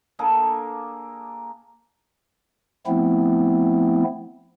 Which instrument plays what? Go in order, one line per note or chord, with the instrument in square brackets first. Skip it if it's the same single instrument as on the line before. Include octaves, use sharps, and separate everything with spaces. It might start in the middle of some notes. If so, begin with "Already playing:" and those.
[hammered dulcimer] A#3 D4 G#4 A4
[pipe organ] F3 A3 B3 C4 E4